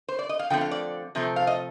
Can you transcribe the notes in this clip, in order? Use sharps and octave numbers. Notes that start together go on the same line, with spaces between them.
C5
D5
D#5
F5
D3 F3 A3 C4 G5
F5
D5
C3 F3 A3 C4
F5
D#5